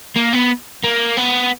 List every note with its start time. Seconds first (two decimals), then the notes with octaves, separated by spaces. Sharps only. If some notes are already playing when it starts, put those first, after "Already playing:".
0.16 A#3
0.33 B3
0.84 A#3
1.17 B3